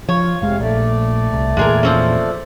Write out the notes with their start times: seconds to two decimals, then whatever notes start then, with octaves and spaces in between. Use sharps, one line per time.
0.09 F3 F4 C#5
0.42 F1 C3 G#3 F5
0.60 A#1 A3 D5
1.33 C2
1.57 E2 A#2 G#3 G#4 A#4
1.83 F3 C4 C#4